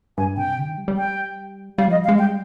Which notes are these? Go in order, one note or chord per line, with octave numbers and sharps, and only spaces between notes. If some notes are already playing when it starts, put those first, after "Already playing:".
G2 G#5
C3 G5
D3
D#3
G3
G3
G5
G3 F5
F3 D#5
G3
F5
G#3
G3 G5